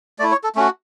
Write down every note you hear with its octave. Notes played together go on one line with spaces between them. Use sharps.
A3 E4 D5
C#5
A4
A3 C#4 F#4